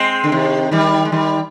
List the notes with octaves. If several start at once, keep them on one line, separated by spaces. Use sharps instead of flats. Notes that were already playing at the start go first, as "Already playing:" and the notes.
Already playing: G#3 C4
D3
C3 D#3
D#3 G3
G#3
D#3 G3